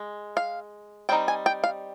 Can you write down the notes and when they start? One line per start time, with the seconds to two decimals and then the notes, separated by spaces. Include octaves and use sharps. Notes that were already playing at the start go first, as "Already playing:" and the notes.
Already playing: G#3
0.37 F5
1.09 G3 C4 D#4 G5
1.28 G#5
1.46 G5
1.64 F5